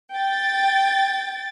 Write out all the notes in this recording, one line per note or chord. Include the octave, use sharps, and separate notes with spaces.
G5 A6